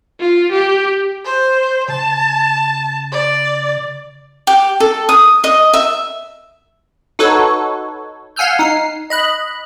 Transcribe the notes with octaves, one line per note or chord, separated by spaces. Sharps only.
F4
G4
C5
C#3 A5
D5
G4
A4
D#6
D#5
E5
D#4 F#4 A4 B4 C#5
F5 F#5 G#5 E6 F6 G6
D#4 C7
D#5 B5 F#6